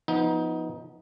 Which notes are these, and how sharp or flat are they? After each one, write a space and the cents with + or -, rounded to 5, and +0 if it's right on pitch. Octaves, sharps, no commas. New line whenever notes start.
F3 +5 B3 +0 D#4 +20